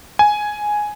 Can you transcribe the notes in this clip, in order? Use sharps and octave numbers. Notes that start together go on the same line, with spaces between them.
G#5